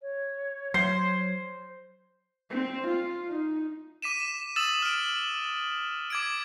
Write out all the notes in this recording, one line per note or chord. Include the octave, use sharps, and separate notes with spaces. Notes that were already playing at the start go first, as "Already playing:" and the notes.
C#5
F#3 C5 C7
C4
F4
D#4
D6 B6 D#7 E7
D#6 E6 A6 E7 F#7
F6 D7
D6 G#6 D7